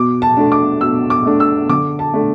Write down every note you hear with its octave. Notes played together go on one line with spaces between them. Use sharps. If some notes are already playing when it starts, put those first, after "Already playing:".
Already playing: B2 D6
A5
A3 D4
D6
B2 E6
D6
A3 D4
E6
D3 D6
A5
A3 D4